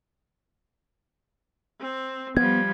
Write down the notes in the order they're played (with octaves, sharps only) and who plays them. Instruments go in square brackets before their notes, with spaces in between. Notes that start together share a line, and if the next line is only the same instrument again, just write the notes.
[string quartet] C4
[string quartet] F3 G3 [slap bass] B3 [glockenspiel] G#6